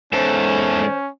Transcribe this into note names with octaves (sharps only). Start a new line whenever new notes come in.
E2 G#2 C#4 A4 C5 A5